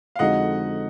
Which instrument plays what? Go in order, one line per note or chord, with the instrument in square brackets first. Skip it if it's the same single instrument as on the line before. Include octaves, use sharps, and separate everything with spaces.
[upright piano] F5
[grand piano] F2 D3 G#3 D#4 F#4 [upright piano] D#5 F#5